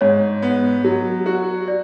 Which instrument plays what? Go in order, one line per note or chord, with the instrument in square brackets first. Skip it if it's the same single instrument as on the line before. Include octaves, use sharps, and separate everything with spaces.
[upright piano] G#2 [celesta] C#5
[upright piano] B3
F#3
F#4
[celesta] D5